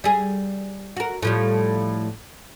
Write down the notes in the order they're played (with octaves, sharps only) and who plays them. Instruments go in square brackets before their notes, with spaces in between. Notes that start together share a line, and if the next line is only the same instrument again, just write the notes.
[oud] G3 G#4
F#4 A#4
A2 F3 G3